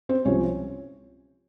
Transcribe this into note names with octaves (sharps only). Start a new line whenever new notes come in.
C4 C5
C2 C3 F3 C#4 C#5